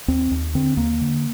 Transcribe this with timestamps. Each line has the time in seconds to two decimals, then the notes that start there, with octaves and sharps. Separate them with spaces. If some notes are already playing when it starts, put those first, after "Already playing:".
0.08 D#2 C4
0.31 D#2
0.55 D3 C4
0.77 D#2 A#3
1.01 D3